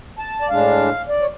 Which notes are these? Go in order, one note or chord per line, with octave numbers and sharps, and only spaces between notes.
A5
D5
A2 G#3 D4 F5
D5
C#5